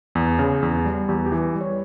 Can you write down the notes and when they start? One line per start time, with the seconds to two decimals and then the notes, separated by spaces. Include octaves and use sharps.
0.15 E2
0.39 C#3
0.62 E2
0.86 G3
1.09 E2 G4
1.26 G4
1.32 E3
1.55 G3
1.61 C#5